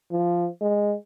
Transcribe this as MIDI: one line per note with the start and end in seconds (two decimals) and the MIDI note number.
0.11 0.48 53
0.61 0.95 56